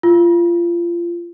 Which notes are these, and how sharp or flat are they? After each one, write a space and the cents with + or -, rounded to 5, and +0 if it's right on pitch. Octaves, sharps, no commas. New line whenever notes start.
F4 -25